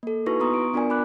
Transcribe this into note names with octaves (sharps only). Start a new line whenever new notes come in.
A#3 A4
D#4 E4 F#4 B4 C#6 A#6
B3 A#5 C6 C#6 D#6
D7
B3 D4 F4 A#4 D5 G#5
B5 D6 F#6